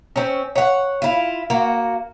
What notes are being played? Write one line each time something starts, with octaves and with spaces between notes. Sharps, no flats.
C4 C#4
C#5 F#5
E4 F4
A#3 F#4